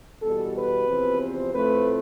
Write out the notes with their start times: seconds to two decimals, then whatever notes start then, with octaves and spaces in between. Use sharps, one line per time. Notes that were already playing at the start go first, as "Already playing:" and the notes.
0.22 E2 B2 G3 A4
0.55 B4
0.86 E2 C3 F3 C4
1.19 C5
1.52 A2 F3 A3 C4 B4